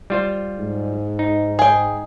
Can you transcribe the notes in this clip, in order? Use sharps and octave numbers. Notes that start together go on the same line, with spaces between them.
G3 F4 C5
G#2
D#4
G#4 G5